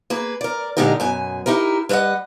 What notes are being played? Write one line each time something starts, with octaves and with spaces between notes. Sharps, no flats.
A#3 G#4 B4
A#4 D5
A#2 D3 G#3 D#4 G4 A#4
F#2 B2 G#5
D#4 E4 G4 A#4
G3 B4 C5 D#5 F#5